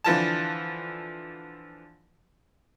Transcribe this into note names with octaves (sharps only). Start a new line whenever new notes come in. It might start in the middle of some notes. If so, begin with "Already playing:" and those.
D3 E3 F3 A5